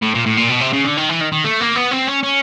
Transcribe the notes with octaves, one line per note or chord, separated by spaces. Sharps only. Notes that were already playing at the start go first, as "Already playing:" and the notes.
A2
A#2
A2
A#2
B2
C3
C#3
D3
D#3
E3
D#3
D#3
A3
A#3
B3
C4
C#4
C#4